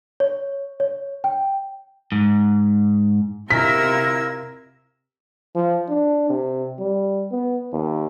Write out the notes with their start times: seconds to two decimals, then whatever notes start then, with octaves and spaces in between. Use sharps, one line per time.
0.20 C#5
0.80 C#5
1.24 G5
2.12 G#2
3.51 C3 E4 F4 A#4 D#5 E6 B6
5.55 F3
5.89 D4
6.29 C3
6.79 G3
7.31 B3
7.73 D#2